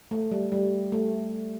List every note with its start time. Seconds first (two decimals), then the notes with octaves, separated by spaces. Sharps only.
0.11 A3
0.31 G3
0.52 G3
0.92 A3